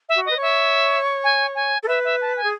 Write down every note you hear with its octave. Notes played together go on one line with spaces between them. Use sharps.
E5
F#4
B4 D#5
C#5
E5
G#5
G#5
A4
B4 E5
E5
A5
G#5
G#4